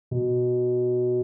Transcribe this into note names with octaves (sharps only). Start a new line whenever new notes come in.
B2